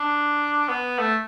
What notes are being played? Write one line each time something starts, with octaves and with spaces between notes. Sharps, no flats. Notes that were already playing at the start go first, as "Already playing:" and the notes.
Already playing: D4
B3
A3